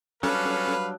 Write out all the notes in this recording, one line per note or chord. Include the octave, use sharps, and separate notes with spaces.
F#3 G3 C#4 D4 A4 B4 F5